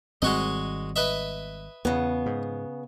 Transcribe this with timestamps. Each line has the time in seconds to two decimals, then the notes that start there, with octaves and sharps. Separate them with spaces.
0.22 G#1 G3 G#3 C4 F#4 D#5
0.96 B4 D#5 E5
1.85 E2 C#3 B3
2.26 G#2